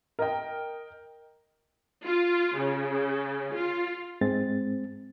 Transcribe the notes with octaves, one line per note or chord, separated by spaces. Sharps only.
A#4 D#5 G5
F4
C#3
F4
G#2 G#3 C4 A6